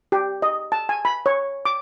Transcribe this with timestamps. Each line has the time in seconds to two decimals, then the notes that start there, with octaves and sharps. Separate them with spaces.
0.12 G4
0.42 D#5
0.72 A5
0.89 G#5
1.05 B5
1.26 C#5
1.65 D6